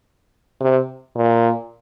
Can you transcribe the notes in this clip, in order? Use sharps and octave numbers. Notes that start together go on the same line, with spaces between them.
C3
A#2